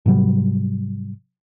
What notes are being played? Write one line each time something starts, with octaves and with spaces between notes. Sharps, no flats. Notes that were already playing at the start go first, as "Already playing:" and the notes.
G#2 C3 F#3 G3